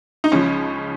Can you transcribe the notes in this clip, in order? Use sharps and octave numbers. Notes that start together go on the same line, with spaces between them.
D#4
C#2 C#3 F3 C#4